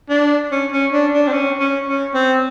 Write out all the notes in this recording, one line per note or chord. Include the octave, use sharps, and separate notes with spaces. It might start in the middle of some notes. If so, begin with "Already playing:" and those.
D4
C#4
C#4
D4
D4
C4
C#4
C#4
C#4
C4